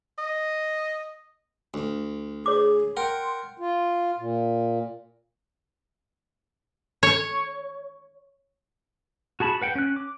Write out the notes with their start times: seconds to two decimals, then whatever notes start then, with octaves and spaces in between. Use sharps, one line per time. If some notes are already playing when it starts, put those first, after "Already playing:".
0.18 D#5
1.74 D2
2.46 G#4 C#5 D6
2.97 A#4 F#5 G5 C6
3.58 F4
4.18 A#2
7.03 C#5
9.40 F#4 G#4 A5 B5
9.61 B4 F#5 G5
9.75 C#4 F#6
9.96 D6